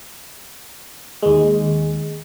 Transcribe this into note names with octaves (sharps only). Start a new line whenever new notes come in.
D#2 G#3